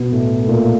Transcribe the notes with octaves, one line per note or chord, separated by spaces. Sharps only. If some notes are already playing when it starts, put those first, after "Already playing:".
Already playing: B2 B3
A2 A3
A3
A#2 A#3